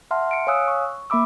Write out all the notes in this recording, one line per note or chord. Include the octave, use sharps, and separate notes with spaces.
E5 F#5 A5 C6 F6
C#7 D7
C#5 F5 G#5 D#6 E6 F#6
C#6
A#3 E5 B5 D6 E6